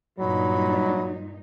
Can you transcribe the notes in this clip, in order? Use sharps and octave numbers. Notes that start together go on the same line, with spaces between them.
G2 A#2 F#3 D#4 B5